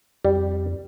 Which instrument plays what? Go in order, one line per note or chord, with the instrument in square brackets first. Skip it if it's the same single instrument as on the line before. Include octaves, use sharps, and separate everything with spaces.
[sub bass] F2 [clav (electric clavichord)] G3